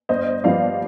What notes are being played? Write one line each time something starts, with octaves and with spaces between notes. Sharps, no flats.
G1 C5 D#5
G2 F3 B3 D5 F5